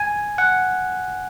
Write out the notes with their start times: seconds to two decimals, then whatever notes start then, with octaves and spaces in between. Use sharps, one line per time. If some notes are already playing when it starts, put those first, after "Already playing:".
Already playing: G#5
0.38 F#5